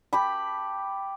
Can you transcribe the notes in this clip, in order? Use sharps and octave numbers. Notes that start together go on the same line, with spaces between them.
G4 A5 B5